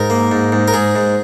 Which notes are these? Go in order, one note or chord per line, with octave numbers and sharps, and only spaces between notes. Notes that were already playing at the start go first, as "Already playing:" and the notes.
Already playing: G#2 A#4
A#3
G#2
G#2
A#4
G#2 G#4
G#2